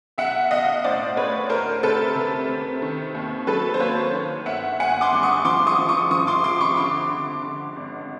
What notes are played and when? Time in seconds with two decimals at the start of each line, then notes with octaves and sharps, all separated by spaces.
0.18 B1 E5 F#5
0.51 B1 D#5 F5
0.84 A2 C5 D5
1.17 A3 B4 C#5
1.49 D2 A#4 C5
1.83 C3 A4 B4
2.15 C3
2.48 C3
2.82 D#3
3.15 D#2
3.47 F#3 A4 B4
3.74 C5
3.80 A#3 B4 C#5
4.13 D#3
4.46 G1 E5 F#5
4.79 G1 F#5 G#5
5.01 C6 D6
5.13 G2
5.23 C#6 D#6
5.45 F3 C6 D6
5.67 C#6 D#6
5.78 F3
5.89 C#6 D#6
6.11 F3 C#6 D#6
6.27 C6 D6
6.44 C3 C6 D6
6.61 B5 C#6
6.77 D3 C6 D6
7.10 D3
7.43 D3
7.76 G#1